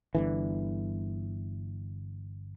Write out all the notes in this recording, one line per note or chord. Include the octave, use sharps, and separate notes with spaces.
G1 D3 E3